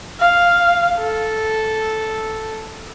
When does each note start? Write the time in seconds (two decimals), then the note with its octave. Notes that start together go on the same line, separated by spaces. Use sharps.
0.20 F5
0.97 A4